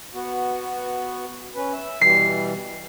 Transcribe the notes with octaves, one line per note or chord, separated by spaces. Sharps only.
B3 F#4
C#4 B4
E5
B2 E3 G3 C7